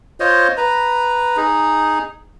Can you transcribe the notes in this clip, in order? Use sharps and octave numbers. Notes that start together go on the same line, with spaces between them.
F4 C5 C#5 D#5
B4 A#5
D#4 G#4